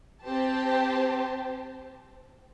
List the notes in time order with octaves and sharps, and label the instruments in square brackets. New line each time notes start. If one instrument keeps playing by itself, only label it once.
[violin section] C4 G4 C5 A5